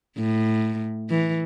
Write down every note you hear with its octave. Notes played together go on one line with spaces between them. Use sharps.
A2
E3